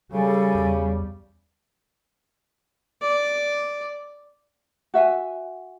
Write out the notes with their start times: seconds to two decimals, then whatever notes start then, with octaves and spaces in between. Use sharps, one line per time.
0.13 C#3 G3 G#4 A4 G#5
0.55 E2
3.02 D5
4.94 F#4 E5 F5 G#5